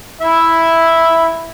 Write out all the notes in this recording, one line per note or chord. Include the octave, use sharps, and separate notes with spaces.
E4 E5